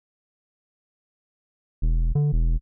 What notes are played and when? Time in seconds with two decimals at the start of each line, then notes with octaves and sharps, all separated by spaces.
1.82 E1
2.15 D3
2.33 E1